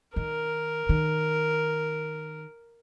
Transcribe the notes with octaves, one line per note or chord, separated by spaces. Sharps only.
D#3 A#4
D#3